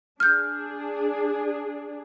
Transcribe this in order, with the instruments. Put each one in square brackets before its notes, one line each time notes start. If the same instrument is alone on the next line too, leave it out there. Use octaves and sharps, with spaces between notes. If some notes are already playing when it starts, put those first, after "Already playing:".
[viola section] D4 G#4 [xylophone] F6 G6